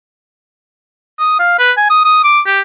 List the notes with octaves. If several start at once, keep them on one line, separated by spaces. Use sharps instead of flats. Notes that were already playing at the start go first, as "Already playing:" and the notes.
D#6
F5
B4
G#5
D#6
D#6
D6
G4